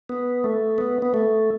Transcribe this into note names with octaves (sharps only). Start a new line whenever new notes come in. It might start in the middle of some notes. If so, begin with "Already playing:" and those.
B3
A3
B3
B3
A3